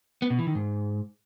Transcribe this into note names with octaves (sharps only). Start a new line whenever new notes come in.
B3
B2
E3
D#3
G#2